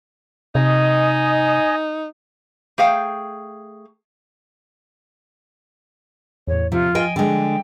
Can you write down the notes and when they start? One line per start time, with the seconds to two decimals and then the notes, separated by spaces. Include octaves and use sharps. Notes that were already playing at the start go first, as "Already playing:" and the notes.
0.55 C3 D#4 D#5 G#5
2.78 A3 G#4 F5 G5
6.47 E2 A2 C#5
6.72 C3 F3 F4
6.95 D#5 G5 G#5
7.16 D3 G#3 G5